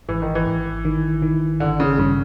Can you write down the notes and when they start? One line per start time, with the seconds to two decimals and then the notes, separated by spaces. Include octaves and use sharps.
0.09 G#1 E3
0.22 D#3
0.35 E3
0.46 G#1
0.85 D#3
1.22 D#3
1.60 G#1 D3
1.80 C#3
1.98 G2 C#3